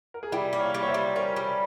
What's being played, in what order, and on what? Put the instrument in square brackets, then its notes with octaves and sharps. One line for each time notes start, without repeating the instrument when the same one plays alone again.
[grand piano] A#4
G#4
[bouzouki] G3 [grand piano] E4 G4
[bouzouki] A#3
[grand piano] C#5 F5
[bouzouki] G3
[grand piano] C#5
C5 E5
[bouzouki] G3
[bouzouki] C#4 [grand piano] A#4 C#5
[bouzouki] G3